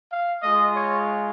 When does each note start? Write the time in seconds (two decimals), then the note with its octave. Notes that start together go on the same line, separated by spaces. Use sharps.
0.12 F5
0.43 G#3 F4 D#5
0.75 C#5